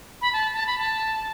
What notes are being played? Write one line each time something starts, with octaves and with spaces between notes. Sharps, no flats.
B5
A5
A5
B5
A5